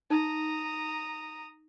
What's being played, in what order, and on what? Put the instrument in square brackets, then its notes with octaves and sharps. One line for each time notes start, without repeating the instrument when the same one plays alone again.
[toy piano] D#4 [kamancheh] A#5 D#6